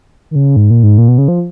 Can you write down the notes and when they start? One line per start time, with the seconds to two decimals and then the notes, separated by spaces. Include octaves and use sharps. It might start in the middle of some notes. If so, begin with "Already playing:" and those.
0.31 D#3
0.35 C#3
0.56 G#2
0.70 A#2
0.83 G#2
0.98 A#2
1.08 B2
1.18 C#3
1.28 F3